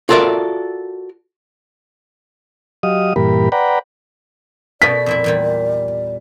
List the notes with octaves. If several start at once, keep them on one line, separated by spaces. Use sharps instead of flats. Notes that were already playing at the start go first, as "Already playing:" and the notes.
F4 F#4 A4 A#4 D5 E5
F#3 G4 D#5 F5 D#6
G2 A#2 E3 G4 A#4 B5
B4 D5 F#5 G5 A#5 B5
B2 A3 B3 D5 B6
F2 A#2 E4
E2 A#2 G3